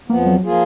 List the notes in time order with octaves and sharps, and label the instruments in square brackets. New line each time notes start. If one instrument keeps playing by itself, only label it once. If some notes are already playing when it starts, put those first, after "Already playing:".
[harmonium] F2 F3 B3 [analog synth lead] A#3
[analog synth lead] F#3
[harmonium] F3 A#3 F4 G#4